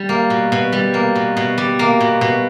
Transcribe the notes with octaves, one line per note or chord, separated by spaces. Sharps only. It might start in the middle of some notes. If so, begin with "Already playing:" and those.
Already playing: G3
A#3
B2
B2
G3
A#3
B2
B2
G3
A#3
B2
B2